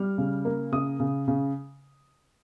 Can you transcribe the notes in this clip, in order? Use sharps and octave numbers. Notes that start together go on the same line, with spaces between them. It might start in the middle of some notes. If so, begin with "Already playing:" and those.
Already playing: G3 F6
C#3
A#3
C#3 D#6
C#3
C#3